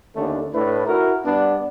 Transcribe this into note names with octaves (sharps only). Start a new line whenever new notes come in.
D#2 D3 A3 C#4 D4
A2 A3 D4 E4 B4
E4 F#4 A#4
G2 B3 D4